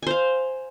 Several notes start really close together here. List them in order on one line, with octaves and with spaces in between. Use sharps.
G#5 C5 F5